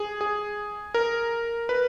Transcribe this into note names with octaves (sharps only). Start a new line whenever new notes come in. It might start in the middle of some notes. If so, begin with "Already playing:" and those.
Already playing: G#4
G#4
A#4
B4